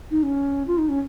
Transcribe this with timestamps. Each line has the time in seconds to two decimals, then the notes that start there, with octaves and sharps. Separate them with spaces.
0.11 D#4
0.23 C#4
0.67 F4
0.78 D#4
0.89 C#4